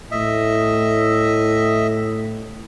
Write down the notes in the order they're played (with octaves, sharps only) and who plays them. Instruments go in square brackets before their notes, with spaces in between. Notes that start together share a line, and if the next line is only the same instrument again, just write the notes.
[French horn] A2 [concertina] D#5 E5